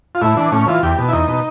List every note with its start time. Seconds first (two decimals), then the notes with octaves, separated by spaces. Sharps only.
0.15 F4
0.22 A2 E4
0.37 E3 D4
0.52 A2 C#4
0.67 E3 F4
0.83 E2 G4
0.98 B2
1.09 E4
1.13 E2 D#4
1.28 B2